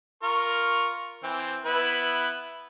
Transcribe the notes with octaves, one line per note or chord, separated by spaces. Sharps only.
F4 A#4 C#6
E3 C4
B3 E4 B4